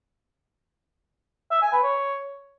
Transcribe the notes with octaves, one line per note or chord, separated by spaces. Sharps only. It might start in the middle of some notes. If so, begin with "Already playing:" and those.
E5
G#5
B4
C#5